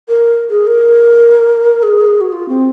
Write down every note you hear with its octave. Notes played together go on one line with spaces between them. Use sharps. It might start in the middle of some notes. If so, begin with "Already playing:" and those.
A#4
G#4
A#4
G#4
F#4
F4
C4